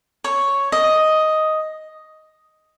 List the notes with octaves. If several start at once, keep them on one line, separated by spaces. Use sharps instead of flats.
C#5
D#5